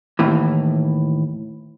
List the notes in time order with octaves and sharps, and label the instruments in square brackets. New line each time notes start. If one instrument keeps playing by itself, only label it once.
[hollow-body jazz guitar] D#2 A2 E3